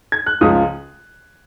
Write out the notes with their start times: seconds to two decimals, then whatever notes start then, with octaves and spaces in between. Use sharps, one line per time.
0.12 G#6
0.26 F#6
0.41 C#2 C#3 F3 D#6